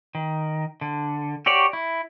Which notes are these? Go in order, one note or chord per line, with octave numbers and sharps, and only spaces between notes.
D#3
D3
F#4 G4 C#5 D5
E4